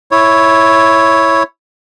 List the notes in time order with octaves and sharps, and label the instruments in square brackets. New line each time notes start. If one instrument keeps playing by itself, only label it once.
[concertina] E4 C#5